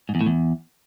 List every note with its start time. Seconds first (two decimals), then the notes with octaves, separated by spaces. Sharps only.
0.09 G#2
0.15 E2
0.21 A2
0.26 E2